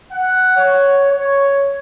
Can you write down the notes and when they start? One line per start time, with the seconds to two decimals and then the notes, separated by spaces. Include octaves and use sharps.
0.11 F#5
0.56 C#5
1.10 C#5